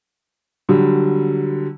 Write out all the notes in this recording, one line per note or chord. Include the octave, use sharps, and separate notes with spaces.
D3 F#3 G3